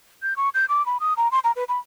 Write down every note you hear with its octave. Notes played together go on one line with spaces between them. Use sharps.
G6
C#6
G6
D6
B5
D#6
A#5
C6
A#5
B4
B5